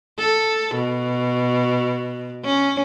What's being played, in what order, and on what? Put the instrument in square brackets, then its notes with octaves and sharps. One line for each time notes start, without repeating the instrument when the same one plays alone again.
[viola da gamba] A4
B2
C#4